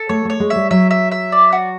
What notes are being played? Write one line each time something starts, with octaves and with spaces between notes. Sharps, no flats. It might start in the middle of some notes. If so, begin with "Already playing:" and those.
Already playing: A4
A3 C#5
A3 C#5
G#3
E5
G3
F#3 E5
E5
E5
D5
F#4